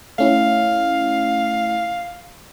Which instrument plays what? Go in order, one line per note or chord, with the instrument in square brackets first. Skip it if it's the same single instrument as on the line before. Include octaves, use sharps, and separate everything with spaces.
[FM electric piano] A3 C#4 E4 [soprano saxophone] F5